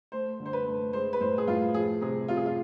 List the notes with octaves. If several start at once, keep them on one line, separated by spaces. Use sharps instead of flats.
A3 C5
D3
C5
B4
A3
G#3 C5
B4
A2 C5
G#4
A2 F4
F3 G#4
C3 G#4
C3 F4
G#4
F4